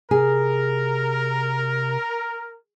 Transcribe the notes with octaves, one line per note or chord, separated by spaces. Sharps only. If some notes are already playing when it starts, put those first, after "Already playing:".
C3 G#4 A#4